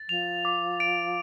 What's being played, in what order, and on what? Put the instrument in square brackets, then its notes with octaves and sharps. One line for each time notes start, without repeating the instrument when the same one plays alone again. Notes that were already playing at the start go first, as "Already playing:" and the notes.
Already playing: [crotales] A6
[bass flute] F3 [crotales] F7
[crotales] D6
D7